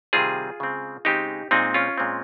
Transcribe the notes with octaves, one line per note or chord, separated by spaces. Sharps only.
C3 D#3 G3 C4 F4 G#4
C#3 G#3 C4
C#3 G#3 C4 D#4 G4
A#2 G#3 C4 D#4
C#4 F4
A#2 G#3 C4